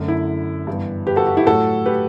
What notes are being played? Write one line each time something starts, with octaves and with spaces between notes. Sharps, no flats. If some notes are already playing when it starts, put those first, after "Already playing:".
Already playing: F#2 D3 A3
E4
G2 E3 G3 B3
G4 B4
F#4 A4
F#4
E4 G4
A2 F#3 A3 F#4 A4
G4 B4